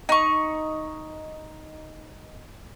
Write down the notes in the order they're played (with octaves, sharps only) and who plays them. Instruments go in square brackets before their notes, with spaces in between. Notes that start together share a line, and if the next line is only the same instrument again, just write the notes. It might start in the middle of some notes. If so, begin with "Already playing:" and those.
[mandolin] D#4 C#6